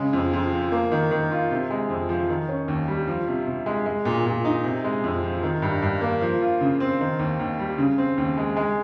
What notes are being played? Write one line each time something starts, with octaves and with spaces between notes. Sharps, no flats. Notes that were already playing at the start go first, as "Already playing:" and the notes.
Already playing: C#3 G#3
F2
F2
F3
A#3
D#3
D#3
F4
C3
G#3
F2
F3
D#3
C#4
D#2
G3
F3
C3
C3
G#3
G#3
A#2
A#2
D#4
C3
G#3
F2
F3
D#3
G2
G2
A#3
F3
F4
C#3
C4
D#3
D#2
D#2
G3
C#3
C4
D#2
G#3
G#3